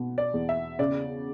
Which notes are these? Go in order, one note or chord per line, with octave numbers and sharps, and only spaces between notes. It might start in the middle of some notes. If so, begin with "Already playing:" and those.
Already playing: B2
D5
E2
E5
C#3 D5